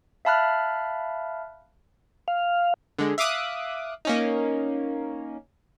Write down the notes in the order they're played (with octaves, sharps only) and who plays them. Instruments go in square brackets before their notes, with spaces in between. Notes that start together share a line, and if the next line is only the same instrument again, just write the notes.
[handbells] E5 F5 A5 B5 F6 F#6
[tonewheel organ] F5
[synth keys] D3 G#3
E5 F5 D6 D#6 F#6
A#3 C#4 D#4